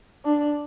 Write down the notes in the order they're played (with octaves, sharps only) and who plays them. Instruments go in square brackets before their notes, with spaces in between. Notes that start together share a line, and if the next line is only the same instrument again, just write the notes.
[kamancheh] D4